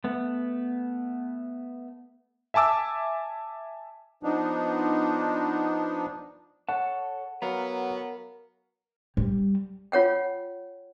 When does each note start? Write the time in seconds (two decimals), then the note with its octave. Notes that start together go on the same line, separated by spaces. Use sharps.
0.04 A3 B3
2.54 E5 G#5 A5 D6 E6
4.23 F3 B3 D4 D#4
6.69 A4 C#5 F#5 A5
7.42 F#3 B3 A#4 F5 A#5
9.17 G3
9.92 F4 C#5 F#5 G5